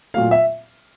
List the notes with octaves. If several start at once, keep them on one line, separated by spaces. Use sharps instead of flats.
A#2 F#3 A3 F5
E5